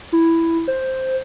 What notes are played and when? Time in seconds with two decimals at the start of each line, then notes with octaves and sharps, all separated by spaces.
0.12 E4
0.68 C5